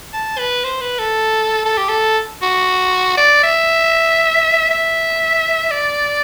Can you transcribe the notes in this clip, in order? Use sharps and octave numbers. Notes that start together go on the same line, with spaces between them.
A5
B4
C5
B4
A4
A4
G4
A4
F#4
D5
E5
E5
D5